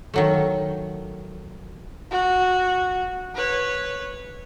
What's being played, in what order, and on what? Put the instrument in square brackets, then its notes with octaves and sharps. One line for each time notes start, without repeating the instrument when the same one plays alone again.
[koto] D#3 F#3 A3
[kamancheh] F#4
B4 C#5